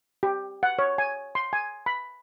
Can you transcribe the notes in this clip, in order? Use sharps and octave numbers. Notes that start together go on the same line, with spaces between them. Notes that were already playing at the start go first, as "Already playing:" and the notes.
G4
F#5
C#5
G#5
C6
G#5
B5